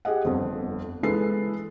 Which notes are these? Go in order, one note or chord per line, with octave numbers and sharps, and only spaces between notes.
G4 G#4 D#5 F#5
G1 F2
E3 G#3 A4 B4 C7